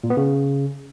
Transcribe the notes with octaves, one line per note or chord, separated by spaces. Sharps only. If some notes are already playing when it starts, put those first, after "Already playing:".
A#2
B3
C#3